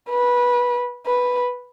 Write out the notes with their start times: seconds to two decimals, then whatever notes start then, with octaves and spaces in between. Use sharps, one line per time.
0.10 B4
1.06 B4